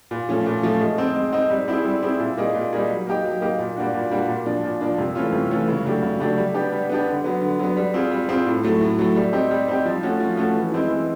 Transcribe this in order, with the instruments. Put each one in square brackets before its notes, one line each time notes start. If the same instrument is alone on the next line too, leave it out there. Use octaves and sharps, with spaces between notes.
[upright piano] A#2
F3 A3 C#4
A#2
F3 A3 C#4
G#3
C4 D#4
G#3
C4 D#4
G3
C4 E4 G#4
G3
C4 E4 G#4
A#2
G3 A#3 D#4 G#4
A#2
G3 A#3 D#4 G#4
F#3
A#3 D#4 G4
F#3
A#3 D#4 G4
A#2
G3 A#3 D4 F#4
A#2
G3 A#3 D4 F#4
A#2
F3 A#3 D4
A#2
F3 A#3 D4
C3
E3 A3 C#4 F4
C3
E3 A3 C#4 F4
C#3
F#3 A3 D4 G4
C#3
F#3 A3 D4 G4
G3
B3 D4 G4
G3
B3 D4 G4
D3
F#3 B3
D3
F#3 B3
G3
C4 F4 G#4
G3
C4 F4 G#4
A2
F#3 A3
A2
F#3 A3
G3
C4 D#4 G4
G3
C4 D#4 G4
F3
A3 C#4 F#4
F3
A3 C#4 F#4
E3
G#3 C4 E4
E3